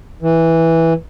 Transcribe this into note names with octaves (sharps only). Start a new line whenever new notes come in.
E3